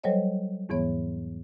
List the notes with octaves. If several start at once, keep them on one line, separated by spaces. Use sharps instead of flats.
F#3 G3 A4 C5 C#5 D#5
E2 G#2 E3 B3 C#5